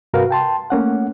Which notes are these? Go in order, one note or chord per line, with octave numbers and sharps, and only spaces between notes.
G2 C3 F#4 A#4 B4 F5
G5 A5 C6
A3 A#3 C#4 F#5